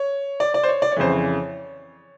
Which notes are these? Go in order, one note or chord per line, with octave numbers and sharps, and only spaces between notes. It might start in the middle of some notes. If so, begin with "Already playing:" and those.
Already playing: C#5
D5
D5
C5
C#5
D5
C#5
F2 C#3 E3 C5
C#5